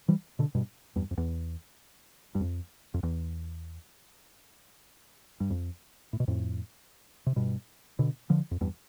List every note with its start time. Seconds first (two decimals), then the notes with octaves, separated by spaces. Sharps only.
0.08 E3 G3
0.39 B2 D3
0.55 G2 B2
0.96 E2 G2
1.11 F2
1.18 E2
2.35 G2
2.40 F2
2.94 F2
3.03 E2
5.40 G2
5.50 F2
6.13 A2
6.20 B2
6.28 F2 A2
7.26 C3
7.36 G2 B2
7.99 B2 D3
8.30 D3 F3
8.51 F2
8.61 E2 G2